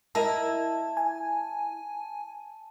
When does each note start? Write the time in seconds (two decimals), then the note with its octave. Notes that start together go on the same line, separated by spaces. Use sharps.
0.15 E4 A#4 D#5 A5
0.97 G#5